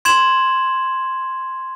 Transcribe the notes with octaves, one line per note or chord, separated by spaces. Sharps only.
C6 G#6 E7 F#7